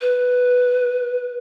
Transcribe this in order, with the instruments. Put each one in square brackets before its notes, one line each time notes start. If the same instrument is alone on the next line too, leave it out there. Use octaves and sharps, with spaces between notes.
[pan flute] B4